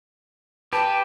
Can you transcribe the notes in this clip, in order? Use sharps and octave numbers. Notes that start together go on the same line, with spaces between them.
G4 B4 A5